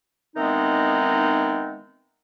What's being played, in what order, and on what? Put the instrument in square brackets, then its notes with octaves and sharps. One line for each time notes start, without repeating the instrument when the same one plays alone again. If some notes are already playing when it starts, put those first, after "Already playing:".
[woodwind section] D#3 E3 G#3 B3 C4 D#4